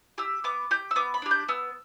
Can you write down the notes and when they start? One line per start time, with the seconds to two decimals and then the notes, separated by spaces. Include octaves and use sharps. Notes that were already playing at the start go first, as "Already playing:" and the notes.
0.18 G4 E6
0.44 B3 D6
0.71 G4 G6
0.91 E6
0.96 B3 D6
1.14 B5
1.22 D4 G4
1.31 G6
1.48 B3 E6